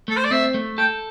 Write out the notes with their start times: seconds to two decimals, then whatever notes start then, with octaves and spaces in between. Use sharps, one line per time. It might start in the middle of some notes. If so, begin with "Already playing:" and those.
0.08 A3 A4
0.17 C5
0.24 D5
0.31 C4 E5
0.54 A3
0.78 A4 G5